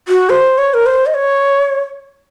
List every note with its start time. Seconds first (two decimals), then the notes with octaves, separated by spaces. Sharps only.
0.08 F#4
0.30 C5
0.58 C#5
0.74 A#4
0.86 C5
1.06 D#5
1.14 C#5